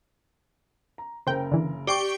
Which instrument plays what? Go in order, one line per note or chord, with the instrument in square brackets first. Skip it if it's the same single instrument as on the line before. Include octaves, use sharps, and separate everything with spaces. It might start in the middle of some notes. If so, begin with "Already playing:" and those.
[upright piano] A#5
[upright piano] F#1 C#3 A#4 [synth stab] C5 G5
[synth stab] D3 E3
[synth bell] G4 G5 C#6 [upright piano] D5 C7 D7 [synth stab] D6